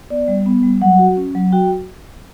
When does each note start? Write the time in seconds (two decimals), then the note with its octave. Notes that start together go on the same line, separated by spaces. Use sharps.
0.10 B3 D5
0.28 G3
0.46 B3
0.63 G3
0.81 F#3 F#5
0.99 F#4
1.17 C#4
1.35 F#3
1.52 F#4 G5